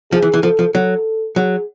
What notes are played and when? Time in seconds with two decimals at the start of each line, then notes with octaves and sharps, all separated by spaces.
0.12 F3 G#4
0.22 E3
0.34 E3
0.43 F3 A4
0.59 F3
0.74 F#3 A4
1.36 F#3 G#4